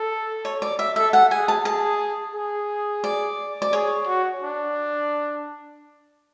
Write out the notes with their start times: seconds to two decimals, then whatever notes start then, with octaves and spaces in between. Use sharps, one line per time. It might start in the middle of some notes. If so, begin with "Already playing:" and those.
Already playing: A4
0.45 C#5
0.62 D5
0.79 E5
0.96 A4 E5
1.13 F#5
1.31 G#4 G#5
1.48 A5
1.65 G#4 A5
2.34 G#4
3.04 D5
3.62 D5
3.73 G#4 C#5
4.07 F#4
4.42 D4